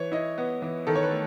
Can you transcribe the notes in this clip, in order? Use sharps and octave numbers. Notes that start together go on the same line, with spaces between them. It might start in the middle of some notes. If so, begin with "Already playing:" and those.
Already playing: E3 C#5
E4 D#5
B3
E3
D#3 A4
C#5
B4
A3